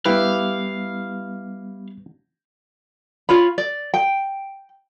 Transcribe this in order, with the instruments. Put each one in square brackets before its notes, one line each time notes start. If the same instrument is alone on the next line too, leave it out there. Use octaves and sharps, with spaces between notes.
[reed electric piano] G3 B3 [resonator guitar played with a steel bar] E4 G4 [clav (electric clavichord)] B4 [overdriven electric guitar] F5
[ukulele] F4 C#5 B5
D5
G5